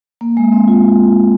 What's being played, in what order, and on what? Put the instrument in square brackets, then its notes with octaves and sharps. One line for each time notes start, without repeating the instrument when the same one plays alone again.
[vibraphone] A#3
G#3
C4
F4